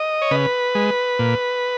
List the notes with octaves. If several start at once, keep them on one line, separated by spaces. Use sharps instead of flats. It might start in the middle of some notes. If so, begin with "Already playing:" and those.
Already playing: D#5
C#5
C#3 B4
G#3
A#2